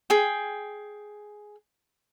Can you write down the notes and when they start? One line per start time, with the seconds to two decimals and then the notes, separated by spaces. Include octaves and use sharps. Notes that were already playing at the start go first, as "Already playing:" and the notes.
0.10 G#4 G5